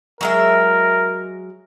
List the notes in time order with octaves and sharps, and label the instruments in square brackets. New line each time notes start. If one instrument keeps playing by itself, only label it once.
[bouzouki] F#3 G#3 E5 [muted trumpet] A#4